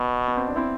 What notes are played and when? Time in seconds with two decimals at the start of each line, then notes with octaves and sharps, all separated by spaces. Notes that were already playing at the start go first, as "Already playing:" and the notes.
Already playing: B2 B3
0.28 B3
0.37 C4
0.47 D4
0.56 C4 E4